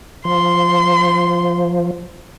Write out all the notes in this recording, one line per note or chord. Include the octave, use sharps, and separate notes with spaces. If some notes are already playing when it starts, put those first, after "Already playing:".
F3 C6